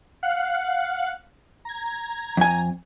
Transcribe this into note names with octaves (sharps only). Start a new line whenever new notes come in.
F5 F#5 F#6
A#5 G#6
F2 G#5